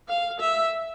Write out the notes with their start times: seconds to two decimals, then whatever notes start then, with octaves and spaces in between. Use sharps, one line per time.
0.09 F5
0.40 E5